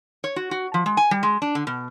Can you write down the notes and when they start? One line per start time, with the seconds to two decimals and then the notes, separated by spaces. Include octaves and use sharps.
0.24 C#5
0.36 F#4
0.51 F#4
0.74 F3
0.86 G#3
0.97 G#5
1.11 G3
1.23 G#3
1.42 D4
1.55 D3
1.67 B2